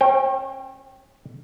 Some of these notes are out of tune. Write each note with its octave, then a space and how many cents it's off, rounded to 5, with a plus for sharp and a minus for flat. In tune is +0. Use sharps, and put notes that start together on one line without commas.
C#4 -35 C5 +30 G5 +0